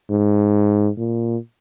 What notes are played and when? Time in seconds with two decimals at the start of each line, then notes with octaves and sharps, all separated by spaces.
0.10 G#2
0.98 A#2